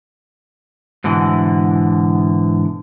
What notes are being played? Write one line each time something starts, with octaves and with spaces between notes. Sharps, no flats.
G#2 B2 D3 E3